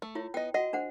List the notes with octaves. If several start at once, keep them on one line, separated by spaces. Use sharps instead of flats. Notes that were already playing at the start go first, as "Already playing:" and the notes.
A3
E4 F4 C#5
B3 D#5 G5
F#4 D#5 F#5
D4 C5 F#5